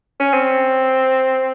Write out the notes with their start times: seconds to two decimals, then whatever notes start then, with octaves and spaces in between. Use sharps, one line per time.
0.20 C#4
0.34 C4